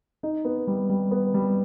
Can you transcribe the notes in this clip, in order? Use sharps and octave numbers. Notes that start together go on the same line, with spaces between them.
D#4
B3
G3
G3
B3
G3